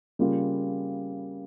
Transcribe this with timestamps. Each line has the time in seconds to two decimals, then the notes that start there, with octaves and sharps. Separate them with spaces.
0.19 C#3 G3 A#3 F4